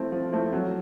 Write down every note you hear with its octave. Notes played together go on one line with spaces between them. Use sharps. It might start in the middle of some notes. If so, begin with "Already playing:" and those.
Already playing: F3 A3 C4 E4
F3
A3 C4 E4
F#3